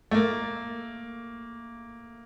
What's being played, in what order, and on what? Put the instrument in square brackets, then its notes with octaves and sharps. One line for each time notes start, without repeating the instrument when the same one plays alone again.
[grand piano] A3
A#3